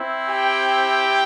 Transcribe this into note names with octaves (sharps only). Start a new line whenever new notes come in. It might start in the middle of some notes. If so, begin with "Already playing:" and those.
Already playing: C4 E4
G4 G5